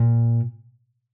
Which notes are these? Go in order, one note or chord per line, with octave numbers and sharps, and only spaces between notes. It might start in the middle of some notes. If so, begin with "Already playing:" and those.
Already playing: A#2